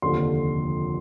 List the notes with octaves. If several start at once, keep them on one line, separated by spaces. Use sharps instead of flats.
F1 D#2 D3 F3 C6